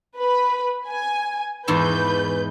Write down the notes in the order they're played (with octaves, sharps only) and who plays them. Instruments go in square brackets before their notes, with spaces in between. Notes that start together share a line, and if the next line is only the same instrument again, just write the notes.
[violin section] B4 B5
G#5
[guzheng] E2 G#2 E5 [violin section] B4 G6